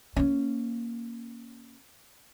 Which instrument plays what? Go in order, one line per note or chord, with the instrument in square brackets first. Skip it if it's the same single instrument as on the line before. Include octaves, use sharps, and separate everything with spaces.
[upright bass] A#3 C#4